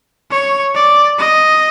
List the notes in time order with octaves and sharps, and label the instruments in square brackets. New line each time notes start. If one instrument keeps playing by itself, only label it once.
[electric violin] C#5
D5
D#5